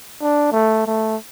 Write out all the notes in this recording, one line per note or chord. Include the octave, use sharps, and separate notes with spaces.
D4
A3
A3